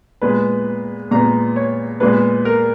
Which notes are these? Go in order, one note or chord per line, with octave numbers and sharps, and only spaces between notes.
A#2 G#3 B3 B4
A#2 G#3 B3 A#5
C#5
A#2 G#3 B3 B4
A#4